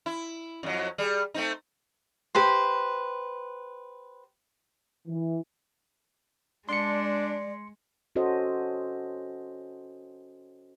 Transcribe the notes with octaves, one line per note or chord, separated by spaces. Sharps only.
E4
F2 F#3
G3 G#4
A3 C4 D#4
G4 B4 C5
E3
G#3 D4 D5 C6 C#7
C#4 F#4 A4 C5 D#5